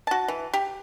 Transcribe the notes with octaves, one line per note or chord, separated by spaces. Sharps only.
F#4 A5
E3
G4